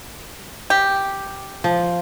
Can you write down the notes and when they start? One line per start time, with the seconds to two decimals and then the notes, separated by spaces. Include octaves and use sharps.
0.70 G4
1.64 F3